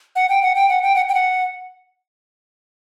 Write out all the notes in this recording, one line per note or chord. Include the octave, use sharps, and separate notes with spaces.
F#5
G5
F#5
G5
F#5
G5
F#5
G5
F#5